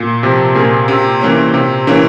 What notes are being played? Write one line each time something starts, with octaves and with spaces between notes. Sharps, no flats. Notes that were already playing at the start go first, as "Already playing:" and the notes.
Already playing: A#2
C3 F3
A#2 A#3 F4 G#4
C3
E3 A#3 C#4
C3
E3 A#3 C#4